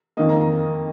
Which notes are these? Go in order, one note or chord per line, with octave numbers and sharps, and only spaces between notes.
F2 D#3 A#3 D#5
A#5
A#5